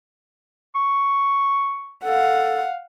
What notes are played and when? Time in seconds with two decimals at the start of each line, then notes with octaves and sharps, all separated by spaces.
0.75 C#6
2.05 A4 F5 F#5